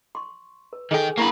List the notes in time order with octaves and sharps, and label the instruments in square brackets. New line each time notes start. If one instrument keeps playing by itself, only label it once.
[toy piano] C6 C#6
B4
[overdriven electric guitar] D#3 G5 [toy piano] G#4 A4 G#5
[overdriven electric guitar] A#3 B5 [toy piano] D4 E4 C#6